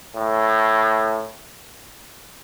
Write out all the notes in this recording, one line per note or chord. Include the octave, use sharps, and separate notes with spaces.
A2